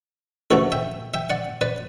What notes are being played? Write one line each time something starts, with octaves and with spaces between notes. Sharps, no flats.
D2 C#3 E3 A3 F#4 A4
E5 G5
E5 G5
D5 F#5
B4 D5